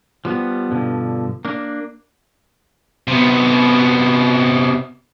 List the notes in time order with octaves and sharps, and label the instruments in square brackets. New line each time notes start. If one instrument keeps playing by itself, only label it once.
[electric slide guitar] F3 G3 B3
G2 B2 D3 F3
A#3 D4
[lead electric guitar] C3 B3